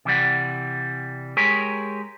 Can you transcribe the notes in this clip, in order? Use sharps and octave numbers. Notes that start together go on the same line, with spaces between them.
C3 E3 G3 F#5
G#3 G4 G#4 A#4 C#5